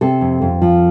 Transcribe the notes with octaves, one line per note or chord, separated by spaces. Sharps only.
C3 A4
F2
F2
F3